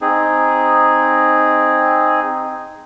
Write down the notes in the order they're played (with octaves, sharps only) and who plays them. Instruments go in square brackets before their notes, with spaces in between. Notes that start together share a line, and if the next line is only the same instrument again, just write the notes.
[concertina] C4 D#4 G#4